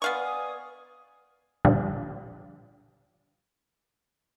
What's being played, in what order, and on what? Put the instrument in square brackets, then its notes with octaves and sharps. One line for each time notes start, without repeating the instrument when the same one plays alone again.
[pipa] B3 F5 C#6 [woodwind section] D5 G#5 D#6
[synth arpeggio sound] A#2 D3 F3 G3